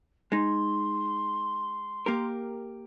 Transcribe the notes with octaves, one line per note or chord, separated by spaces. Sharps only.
G#3 D#4 C6
A#3 G4 A#4